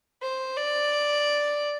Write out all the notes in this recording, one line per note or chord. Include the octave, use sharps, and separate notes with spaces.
C5
D5